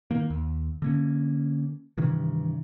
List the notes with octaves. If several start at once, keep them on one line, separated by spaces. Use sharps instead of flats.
D#3 A#3
D#2
D3 A#3 C#4
G2 C3 D#3 E3